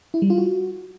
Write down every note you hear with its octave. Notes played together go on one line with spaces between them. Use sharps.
E4
G3
F4
F#4